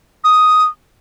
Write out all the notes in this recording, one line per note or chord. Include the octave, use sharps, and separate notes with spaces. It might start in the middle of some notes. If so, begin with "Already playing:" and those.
D#6